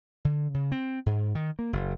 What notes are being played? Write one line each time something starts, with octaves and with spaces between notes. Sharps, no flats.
D3
C#3
C4
G#2
D#3
A#3
F#1